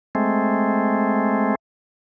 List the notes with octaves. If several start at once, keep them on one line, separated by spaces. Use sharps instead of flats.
G#3 A3 C4